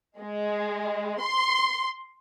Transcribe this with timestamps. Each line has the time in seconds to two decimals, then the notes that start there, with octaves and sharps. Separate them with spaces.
0.19 G#3
1.20 C6